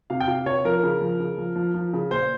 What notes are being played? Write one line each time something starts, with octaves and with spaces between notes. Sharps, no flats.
C3 F5
G5
C3 F5
C3 C#5
F3 A#4
C#3
F3
C#3
F3
F3
F3
C#3
A#2 C5